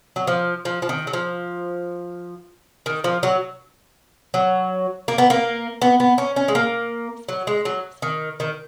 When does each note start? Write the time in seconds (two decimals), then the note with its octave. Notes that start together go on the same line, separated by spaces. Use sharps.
0.16 F#3
0.27 F3
0.65 F3
0.82 F3
0.89 D#3
1.07 F#3
1.13 F3
2.86 D#3
3.04 F3
3.23 F#3
4.34 F#3
5.08 A#3
5.18 B3
5.30 A#3
5.82 B3
6.00 B3
6.18 C#4
6.36 C#4
6.48 G#3
6.55 A#3
7.29 F#3
7.47 G#3
7.65 F#3
8.02 D#3
8.40 D#3